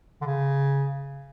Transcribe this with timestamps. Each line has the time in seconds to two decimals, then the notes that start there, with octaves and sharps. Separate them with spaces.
0.21 D3
0.26 C#3